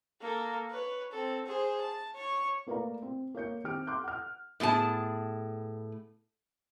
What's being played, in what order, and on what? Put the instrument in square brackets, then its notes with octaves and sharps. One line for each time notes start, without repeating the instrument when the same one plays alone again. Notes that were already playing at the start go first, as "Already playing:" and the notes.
[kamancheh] A#3 A4
B4 C#5
C4 A4
G#4 C5
A5
C#5 C#6
[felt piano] A3 A#3 B4 D5 F5 A#5
C4
A#3 C#5 G6 C#7
D#3 C4 G4 F6 D7
C6 D6 F#6 G6
F#5 F6
[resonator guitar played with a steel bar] A2 B3 G#4 A5